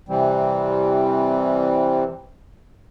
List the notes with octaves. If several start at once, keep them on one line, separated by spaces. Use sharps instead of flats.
C3 E3 G3 C4